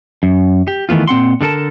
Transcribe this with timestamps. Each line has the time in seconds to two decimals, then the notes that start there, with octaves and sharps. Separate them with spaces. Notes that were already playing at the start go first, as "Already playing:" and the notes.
0.23 F#2
0.68 G4
0.89 D#3 E3 A3 B3 F4
1.08 A#2 C4 F#5 C6
1.41 D3 G3 A4 A#4 A5